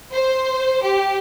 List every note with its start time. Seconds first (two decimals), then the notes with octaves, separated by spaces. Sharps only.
0.12 C5
0.84 G4